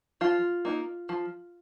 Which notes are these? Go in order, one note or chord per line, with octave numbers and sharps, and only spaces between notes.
F3 F4
A#3 D#4
F3